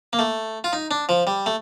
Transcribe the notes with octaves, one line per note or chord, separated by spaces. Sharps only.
A#3
A3
F4
D#4
D4
F3
G3
A3